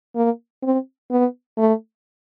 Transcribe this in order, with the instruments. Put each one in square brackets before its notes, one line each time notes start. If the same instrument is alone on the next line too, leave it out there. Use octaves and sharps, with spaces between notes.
[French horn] A#3
C4
B3
A3